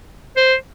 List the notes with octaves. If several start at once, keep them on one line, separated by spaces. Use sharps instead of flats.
C5